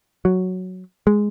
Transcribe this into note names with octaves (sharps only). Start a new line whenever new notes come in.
F#3
G#3